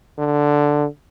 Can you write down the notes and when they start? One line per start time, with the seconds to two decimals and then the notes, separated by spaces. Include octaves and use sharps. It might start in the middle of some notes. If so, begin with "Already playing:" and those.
0.19 D3